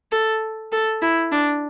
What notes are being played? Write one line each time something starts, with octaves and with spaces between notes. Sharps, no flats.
A4
A4
E4
D4